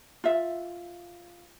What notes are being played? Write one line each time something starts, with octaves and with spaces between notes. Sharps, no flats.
F4 E5